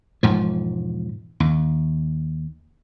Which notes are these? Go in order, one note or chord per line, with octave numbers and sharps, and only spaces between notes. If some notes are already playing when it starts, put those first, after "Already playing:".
E1 G#2 F3
D#2